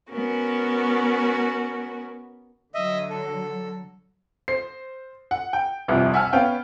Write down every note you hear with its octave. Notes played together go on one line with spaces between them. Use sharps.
B3 C#4 F#4 A#4
D3 F#3 D#5 E5
A4
C5 C7
F#5
G5
G1 C2 F2 C3
E5 F#5 G#5 A5 F6
B3 C#4 F5 G5